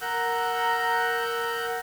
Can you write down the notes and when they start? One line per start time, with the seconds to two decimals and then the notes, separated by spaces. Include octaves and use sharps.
0.01 A#4 F#5 A#5 E6 F#6 G6